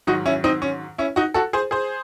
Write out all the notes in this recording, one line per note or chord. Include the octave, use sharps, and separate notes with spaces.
G#2 D#3 F#3 D#4 F#4
C#4 E4
C4 D#4
C#4
C#4 E4
D#4 F#4
F#4 A4
G#4 C5
G#4 C5